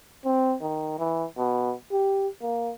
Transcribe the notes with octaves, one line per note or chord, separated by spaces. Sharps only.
C4
D#3
E3
B2
G4
A#3